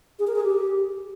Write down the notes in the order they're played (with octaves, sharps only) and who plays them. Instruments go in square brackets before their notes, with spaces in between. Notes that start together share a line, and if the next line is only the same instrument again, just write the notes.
[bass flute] G#4
A#4
G#4
G4